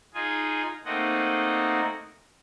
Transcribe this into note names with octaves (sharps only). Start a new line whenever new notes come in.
D#4 F4 G#4 G#5
A3 A#3 C4 D#4 D#5 F#5